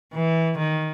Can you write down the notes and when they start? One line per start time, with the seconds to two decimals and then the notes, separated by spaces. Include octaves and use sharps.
0.13 E3
0.58 D#3